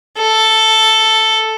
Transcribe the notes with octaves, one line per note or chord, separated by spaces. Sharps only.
A4